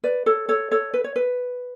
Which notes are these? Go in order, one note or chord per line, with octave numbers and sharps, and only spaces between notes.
B4 D5
A4 C#5
A4 C#5
A4 C#5
B4
C#5
B4